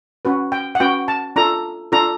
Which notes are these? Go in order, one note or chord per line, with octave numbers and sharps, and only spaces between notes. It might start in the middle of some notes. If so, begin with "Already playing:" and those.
C#4 F#4 B4
G5
F#5
C#4 F#4 B4 G5
A5
D4 F4 A4 A#5
D4 F4 A4 A#5